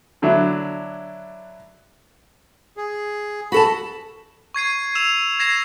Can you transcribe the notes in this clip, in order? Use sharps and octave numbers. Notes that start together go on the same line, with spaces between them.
D3 F#3 D4 E4
G#4
F#4 A4 A5 B5
C#6 G#6 C7 D#7
E6 E7 F7
G#6 A#6 C7 E7